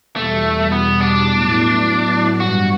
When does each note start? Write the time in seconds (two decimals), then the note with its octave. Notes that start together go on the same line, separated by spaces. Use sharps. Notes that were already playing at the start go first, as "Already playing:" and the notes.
0.16 E2 B2 G3 A3
0.72 B3
1.01 D4
1.29 A2 F#3 B3 E4
2.40 G2 E3 G3 F#4